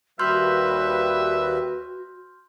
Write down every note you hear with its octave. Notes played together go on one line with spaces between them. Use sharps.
D#2 G3 F#4 B4 E5 C6 F6 G6